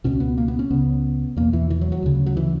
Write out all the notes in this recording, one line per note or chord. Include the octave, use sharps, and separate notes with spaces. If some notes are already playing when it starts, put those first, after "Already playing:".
C#2 B2 C#4
B3
A#3
B3
C#4
C#2 C#3 B3
E2 B2 A#3
E3
E3
F#3
F#3
D2 C#3
F#3
E3